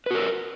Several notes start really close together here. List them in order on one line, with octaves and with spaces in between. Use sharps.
B4 F#4 A#4